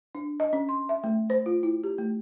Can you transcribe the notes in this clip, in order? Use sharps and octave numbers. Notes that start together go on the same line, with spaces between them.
D4
D#5
C#4
C6
E5
A3
C5
F4
E4
G4
A3